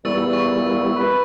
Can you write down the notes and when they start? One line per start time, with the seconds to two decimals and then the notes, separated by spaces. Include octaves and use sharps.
0.05 E2 A#2 G3 B3 E4 C#6 E6 A6
0.33 C#6
0.96 B4